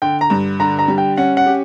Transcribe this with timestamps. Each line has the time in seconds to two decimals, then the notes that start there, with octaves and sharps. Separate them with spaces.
0.02 D3 G5
0.21 A#5
0.30 G2
0.60 D3 A#5
0.79 A#5
0.88 G3
0.98 G5
1.17 C#4 F#5
1.37 F#5
1.46 G4